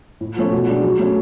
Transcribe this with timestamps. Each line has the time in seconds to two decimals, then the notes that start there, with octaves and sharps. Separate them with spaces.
0.21 A2
0.37 F3 A3 C#4
0.52 B2
0.68 G#3 D4 G#4
0.83 F#3
0.99 A3 C#4